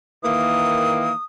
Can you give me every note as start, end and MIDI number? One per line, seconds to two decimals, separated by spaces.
0.23 1.09 51
0.23 1.09 52
0.23 1.09 58
0.23 1.23 87